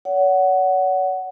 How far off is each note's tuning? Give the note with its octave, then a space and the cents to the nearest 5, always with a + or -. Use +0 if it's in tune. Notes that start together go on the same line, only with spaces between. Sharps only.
C#5 +40 F#5 +10